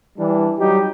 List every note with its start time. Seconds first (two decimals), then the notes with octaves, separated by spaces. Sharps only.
0.17 E3 G3 D4
0.58 F#3 G3 D#4 G4